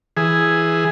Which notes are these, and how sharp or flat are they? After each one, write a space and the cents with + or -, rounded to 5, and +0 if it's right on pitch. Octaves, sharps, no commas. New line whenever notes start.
E3 +0 G#4 +0